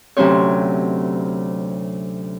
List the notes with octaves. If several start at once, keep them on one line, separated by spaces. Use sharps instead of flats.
D2 C3 F#3 C#4 C5 C#5